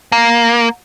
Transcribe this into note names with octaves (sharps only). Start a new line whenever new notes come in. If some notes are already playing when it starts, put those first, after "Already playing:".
A#3